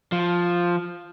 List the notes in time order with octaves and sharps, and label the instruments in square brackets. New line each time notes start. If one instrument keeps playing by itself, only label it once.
[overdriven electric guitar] F3